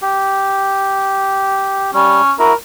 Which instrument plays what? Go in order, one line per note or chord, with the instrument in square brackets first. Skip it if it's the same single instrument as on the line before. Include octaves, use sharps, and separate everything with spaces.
[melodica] G4
[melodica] G3 [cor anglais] C#4
[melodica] E4 F#4 [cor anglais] A#4